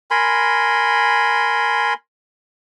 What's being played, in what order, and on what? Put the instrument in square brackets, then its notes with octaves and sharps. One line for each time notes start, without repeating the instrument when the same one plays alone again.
[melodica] A#4 G#5 B5 C6